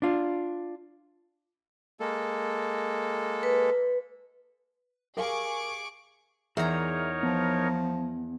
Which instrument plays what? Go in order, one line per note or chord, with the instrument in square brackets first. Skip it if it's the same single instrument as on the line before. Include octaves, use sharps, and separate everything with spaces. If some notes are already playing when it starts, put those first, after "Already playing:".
[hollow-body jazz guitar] D4 F4
[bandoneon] G#3 A#3 A4
[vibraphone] B4
[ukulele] G4 F5 G#5 [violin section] G#4 C#6 D6 [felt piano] A#4
[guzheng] E2 A#5 [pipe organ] D#4 A#4 C#5 [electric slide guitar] G#4 D5 E5
[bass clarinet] F3 [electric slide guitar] B3